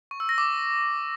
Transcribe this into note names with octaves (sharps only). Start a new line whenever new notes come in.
C#6
E6
A#6
D6